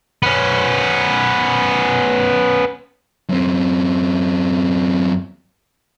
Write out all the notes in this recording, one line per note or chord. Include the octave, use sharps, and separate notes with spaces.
B3 C#4
F#2 C4